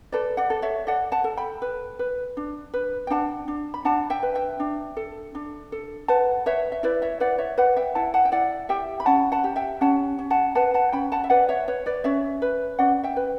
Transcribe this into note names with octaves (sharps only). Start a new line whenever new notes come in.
A4 B4 D5
D5 F#5
A4
C#5 E5
A4 D5 F#5
F#5 A5
A4
G5 B5
B4
B4
D4
B4
G5
D4 F#5 A5
D4
B5
D4 F#5 A5
E5 G5
B4
E5 G5
D4
A4
D4
A4
B4 F#5 A5
B4 C#5 E5
E5
E4 B4 D5
C#5 E5
B4 D5 F#5
C#5 E5
B4 D5 F#5
E5 G5
E4 F#5 A5
F#5 A5
G5
E4 D5 F#5
G4 E5 G5
B5
C#4 F#5 A5
F#5 A5
G4
E5 G5
C#4 F#5 A5
C#4
F#5 A5
B4 F#5 A5
F#5 A5
C#4 G5 B5
F#5 A5
E5
B4 D5 F#5
C#5 E5
B4 C#5
B4 D5
C#4 C#5 E5
B4
C#4 D5 F#5
E5 G5
B4